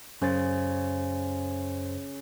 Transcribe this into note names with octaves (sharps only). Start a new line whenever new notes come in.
F#2 C#3 C5 A6